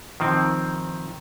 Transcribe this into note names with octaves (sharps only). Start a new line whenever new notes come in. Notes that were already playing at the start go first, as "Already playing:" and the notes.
D#3 F3 C4